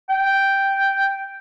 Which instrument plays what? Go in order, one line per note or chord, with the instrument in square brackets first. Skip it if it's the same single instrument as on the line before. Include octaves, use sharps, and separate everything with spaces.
[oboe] G5